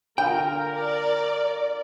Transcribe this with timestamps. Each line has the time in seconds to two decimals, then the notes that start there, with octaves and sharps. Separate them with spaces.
0.18 D3 F4 A#4 G5
0.75 D5